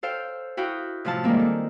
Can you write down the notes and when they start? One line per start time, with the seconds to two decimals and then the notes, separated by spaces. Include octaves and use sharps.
0.03 A4 C5 F5 G5
0.57 E4 F#4 F5 G5 D#6
1.05 A2 C3 F3 F5 A5
1.24 D#3 G3 G#3 A#3 C4
1.39 A4